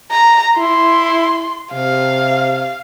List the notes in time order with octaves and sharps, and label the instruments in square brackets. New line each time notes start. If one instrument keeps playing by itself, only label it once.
[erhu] A#5
[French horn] E4 [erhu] C6
[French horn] C3 [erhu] F5